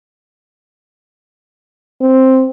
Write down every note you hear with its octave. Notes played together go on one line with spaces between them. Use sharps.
C4